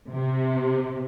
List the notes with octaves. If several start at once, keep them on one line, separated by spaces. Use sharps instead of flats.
C3